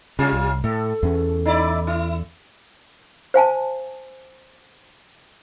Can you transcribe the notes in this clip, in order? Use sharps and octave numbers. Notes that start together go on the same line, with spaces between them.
C#3 G3 C#4 F4
C2
A2 A4
E2 C#4
D#4 E4 D5
E4
C5 F5 G#5 A5